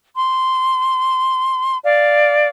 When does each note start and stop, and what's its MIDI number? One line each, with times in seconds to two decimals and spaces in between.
0.16 1.77 84
1.84 2.46 74
1.84 2.46 77